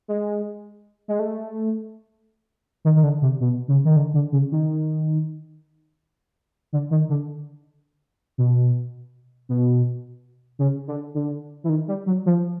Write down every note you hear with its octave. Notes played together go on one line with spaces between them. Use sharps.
G#3
G#3
A3
D#3
D#3
D3
C3
B2
C#3
D#3
D3
D3
C#3
D#3
D3
D#3
D3
B2
B2
C#3
D3
D3
E3
D#3
G3
F#3
F3